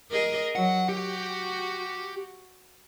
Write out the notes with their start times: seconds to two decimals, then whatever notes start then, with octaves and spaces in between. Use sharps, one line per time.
0.11 G#4 A#4 D#5
0.55 F#3 F#5
0.89 F#4 G4